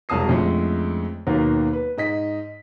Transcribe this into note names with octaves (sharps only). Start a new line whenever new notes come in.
E1 C2 F#3 A5 D#6 C7
F2 D3 G#3 A3 C#4
D#2 B2 D#3 F#3 A#3
B4
G#2 D#5 B6